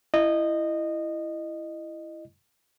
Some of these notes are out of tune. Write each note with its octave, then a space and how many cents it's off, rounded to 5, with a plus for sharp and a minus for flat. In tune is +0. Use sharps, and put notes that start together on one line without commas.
E4 +15 D#5 -20